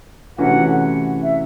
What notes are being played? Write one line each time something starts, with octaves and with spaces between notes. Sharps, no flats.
C3 E3 A3 C#4 F#4 F#5
E5